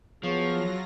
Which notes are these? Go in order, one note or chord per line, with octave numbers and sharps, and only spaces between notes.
F3 F#3 B3 F4 G#4 C#5 A#6